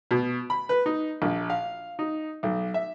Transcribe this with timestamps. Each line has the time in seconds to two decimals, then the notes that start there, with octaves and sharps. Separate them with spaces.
0.11 B2
0.50 B5
0.69 B4
0.86 D#4
1.22 A#1
1.50 F5
1.99 D#4
2.43 B1
2.74 E5